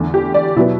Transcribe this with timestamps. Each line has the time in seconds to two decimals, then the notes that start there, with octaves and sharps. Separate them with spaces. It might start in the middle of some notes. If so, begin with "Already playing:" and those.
Already playing: E2 D3 A3
0.14 G4
0.34 D5
0.56 B2 F#3 B3 E4